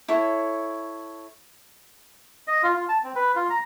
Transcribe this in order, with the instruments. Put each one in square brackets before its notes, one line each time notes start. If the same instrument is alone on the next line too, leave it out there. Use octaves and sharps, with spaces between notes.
[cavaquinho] E4 A4 C#5
[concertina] D#5
F4
F4
A5
C4
B4
F4
A#5